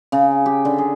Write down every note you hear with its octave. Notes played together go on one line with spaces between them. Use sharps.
C#3
G4
D3
G#4